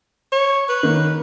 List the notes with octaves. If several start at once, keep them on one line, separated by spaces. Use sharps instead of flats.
C#5
B4
D#3 A#3